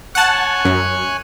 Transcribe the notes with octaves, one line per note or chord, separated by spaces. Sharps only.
C#5 F#5 G#5 A5 F#6
F#2